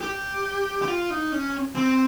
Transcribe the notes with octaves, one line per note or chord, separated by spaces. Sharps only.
G4
G4
F4
D#4
C#4
C4